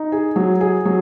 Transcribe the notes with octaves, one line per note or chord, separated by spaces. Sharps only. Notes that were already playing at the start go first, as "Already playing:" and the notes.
Already playing: D#4
G#4
F#3
G#4
F#3